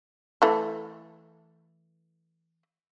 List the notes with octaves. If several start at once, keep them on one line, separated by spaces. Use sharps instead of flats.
E3 A3